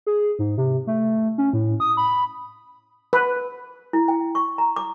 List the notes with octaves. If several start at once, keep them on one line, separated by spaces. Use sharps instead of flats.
G#4
G#2
C3
A3
C#4
A2
D#6
B5
B4
E4
G5
C#6
A#5
D6